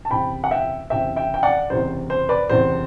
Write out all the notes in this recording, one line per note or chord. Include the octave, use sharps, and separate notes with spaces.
A5
F#1 E2 C3 G5 B5
F#5
E5 G5
F#1 E2 C3 E5 G5
E5 G5
G5
D5 F#5
F#1 E2 C3 C5
C5
B4 D5
F#1 E2 C3 C5